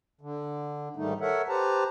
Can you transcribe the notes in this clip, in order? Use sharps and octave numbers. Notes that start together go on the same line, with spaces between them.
D3
G#2 D#3 G3 A3 D#4
A4 A#4 C#5 E5 F#5
G4 B4 C5 A5 A#5